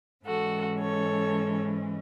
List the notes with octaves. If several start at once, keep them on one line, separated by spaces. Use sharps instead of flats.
G#2 E3 G#3 C#4 F#4 A4
A4 C#5